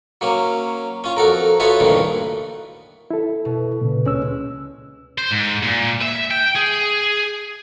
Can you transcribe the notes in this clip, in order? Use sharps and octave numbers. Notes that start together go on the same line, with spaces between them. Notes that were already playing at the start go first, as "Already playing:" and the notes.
F#3 A#3 C#4
C#4 F4
F2 F#4 A4 A#4
B3 F4 F#4 A4 C#5 E5
D2 G2 A#2 D#3 E3
E4 A4
B2
A#2 C#3
C#2 G#3 C#4 E6
C5
G#2
A#2
E5
G5
G#4